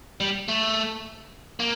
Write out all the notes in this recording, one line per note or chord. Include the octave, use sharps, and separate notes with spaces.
G3
A3
A#3